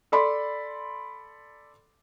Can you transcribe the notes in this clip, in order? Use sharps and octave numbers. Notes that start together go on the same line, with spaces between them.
A4 D5 B5 C6